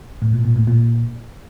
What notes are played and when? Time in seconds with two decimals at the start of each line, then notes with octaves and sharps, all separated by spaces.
0.22 A2
0.33 A#2
0.45 A#2
0.56 A2
0.67 A#2